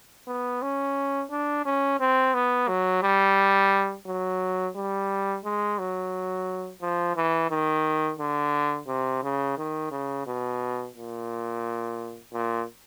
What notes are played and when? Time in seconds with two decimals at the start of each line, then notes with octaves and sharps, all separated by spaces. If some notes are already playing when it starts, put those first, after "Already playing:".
0.27 B3
0.62 C#4
1.31 D4
1.65 C#4
2.00 C4
2.34 B3
2.68 F#3
3.03 G3
4.06 F#3
4.75 G3
5.44 G#3
5.79 F#3
6.82 F3
7.16 E3
7.50 D#3
8.19 D3
8.88 C3
9.23 C#3
9.58 D#3
9.91 C#3
10.26 B2
10.95 A#2
12.33 A#2